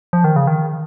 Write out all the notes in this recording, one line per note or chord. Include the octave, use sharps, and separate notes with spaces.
F3
D#3
C#3
D#3